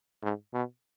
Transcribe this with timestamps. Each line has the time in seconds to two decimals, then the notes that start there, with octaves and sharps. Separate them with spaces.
0.23 G#2
0.53 B2